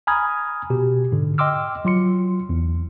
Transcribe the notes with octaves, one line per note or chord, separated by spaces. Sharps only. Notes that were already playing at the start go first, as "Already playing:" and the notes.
G#5 A#5 B5 D#6 F6 G#6
B2 G4
G#2 D3
D#5 G5 C6 D6 E6 F6
F#3 F4 C6 C#7
E2